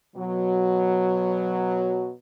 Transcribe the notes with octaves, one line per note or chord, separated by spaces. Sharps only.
B2 F#3